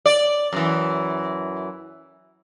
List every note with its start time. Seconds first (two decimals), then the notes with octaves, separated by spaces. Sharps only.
0.06 D5
0.53 F#2 E3